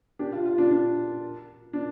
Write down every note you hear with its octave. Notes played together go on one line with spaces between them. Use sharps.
D4 G4
F4
F4
D4
D4
D4